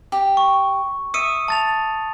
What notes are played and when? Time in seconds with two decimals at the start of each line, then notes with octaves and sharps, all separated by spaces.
0.12 G4
0.37 C#6
1.14 E5 D#6 C#7 D#7
1.48 A5 A6 F7